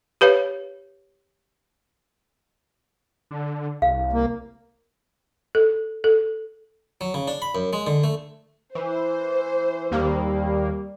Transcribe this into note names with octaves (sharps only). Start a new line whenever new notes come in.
G4 B4 C#5 F5
D3
C2 F5
A#3
A4
A4
F#3
C#3
D4
B5
F#2
G#3
D3
A3
E3 C5
D#2 G3 A#3